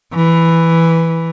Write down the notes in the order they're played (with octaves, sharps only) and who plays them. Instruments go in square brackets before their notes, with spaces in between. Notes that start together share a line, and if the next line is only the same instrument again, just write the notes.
[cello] E3